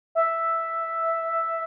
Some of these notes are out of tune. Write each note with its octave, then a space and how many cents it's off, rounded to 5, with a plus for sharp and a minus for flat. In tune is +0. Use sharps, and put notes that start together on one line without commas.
E5 +0